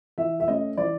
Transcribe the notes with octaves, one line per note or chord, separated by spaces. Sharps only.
E3 E5
E5
A3 C#4 D#5
E3 D5